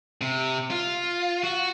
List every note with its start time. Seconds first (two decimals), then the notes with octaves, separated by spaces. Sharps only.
0.21 C3
0.71 F4
1.44 F#4